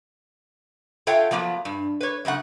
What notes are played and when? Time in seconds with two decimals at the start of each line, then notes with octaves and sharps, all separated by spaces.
1.07 F4 A4 C#5 E5 F#5 G5
1.31 F3 F#3 A#3 B3
1.65 G2
2.01 B4 C#5
2.25 F#2 C#3 A3 F#5